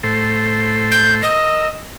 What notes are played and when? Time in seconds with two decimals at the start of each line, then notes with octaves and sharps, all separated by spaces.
0.03 A2 A4 C5
0.91 G6
1.22 A#4 D#5 E6